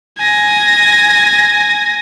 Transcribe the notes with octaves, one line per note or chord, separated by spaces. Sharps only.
G#5 A#6